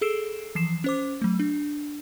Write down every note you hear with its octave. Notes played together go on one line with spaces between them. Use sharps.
G#4 A4 E6 C7 D7 E7
E3 F3 C7 E7
C#4 C5 D6
F#3 A3
D4